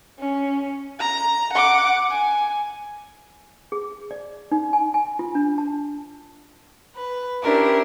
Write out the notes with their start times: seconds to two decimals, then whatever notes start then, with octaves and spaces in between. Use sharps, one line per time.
0.18 C#4
0.99 A#5
1.53 F#5 D6
2.10 G#5
3.72 G#4
4.11 D5
4.51 D#4
4.73 G#5
4.94 G#5
5.19 F4
5.35 D4
5.58 A5
6.96 B4
7.43 C#4 D4 E4 G4 A#4 C5